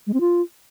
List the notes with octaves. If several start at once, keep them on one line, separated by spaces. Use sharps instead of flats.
G#3
C4
F4